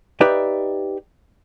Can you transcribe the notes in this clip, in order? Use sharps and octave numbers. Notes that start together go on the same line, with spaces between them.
D#4 G4 B4 D5 E5